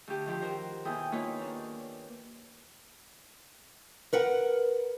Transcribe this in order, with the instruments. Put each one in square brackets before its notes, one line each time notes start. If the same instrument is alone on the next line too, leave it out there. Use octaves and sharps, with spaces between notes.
[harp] D2 G4
D#3 F3 G4
F#4 A#4 C5
D#2 B2 E4 G#4 G5 D#6
A#3 B3 D#4 F4 B4 C#5
D#2 C#4 D4
[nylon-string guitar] A#4 B4 F#5